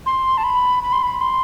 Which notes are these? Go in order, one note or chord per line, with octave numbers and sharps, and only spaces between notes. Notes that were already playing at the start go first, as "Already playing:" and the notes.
C6
A5
B5
B5
C6
B5
C6